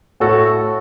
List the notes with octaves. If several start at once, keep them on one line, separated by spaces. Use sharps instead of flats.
A2 F#4 A4